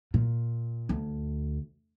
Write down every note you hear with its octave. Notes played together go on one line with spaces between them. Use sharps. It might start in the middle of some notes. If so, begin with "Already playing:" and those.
A#2
D2